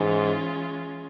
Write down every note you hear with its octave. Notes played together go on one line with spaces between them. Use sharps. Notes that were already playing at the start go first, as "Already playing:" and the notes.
Already playing: G#2 E3 G#3 C#4 F4